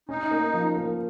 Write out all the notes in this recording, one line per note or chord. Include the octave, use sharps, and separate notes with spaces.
C#4 D#4
A#3
F3
A#3